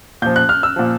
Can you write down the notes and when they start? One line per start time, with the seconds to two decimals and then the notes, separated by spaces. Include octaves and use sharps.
0.22 A#2 F3 G6
0.36 F#6
0.49 F6
0.63 E6
0.76 A#2 F3